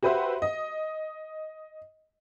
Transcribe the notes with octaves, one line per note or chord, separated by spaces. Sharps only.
F#4 G4 B4 C5 E5 F#5
D#5